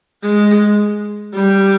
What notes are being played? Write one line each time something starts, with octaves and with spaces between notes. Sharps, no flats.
G#3
G3